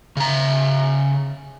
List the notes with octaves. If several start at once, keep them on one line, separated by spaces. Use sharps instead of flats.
C#3 A#5